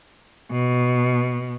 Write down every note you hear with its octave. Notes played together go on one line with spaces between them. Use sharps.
B2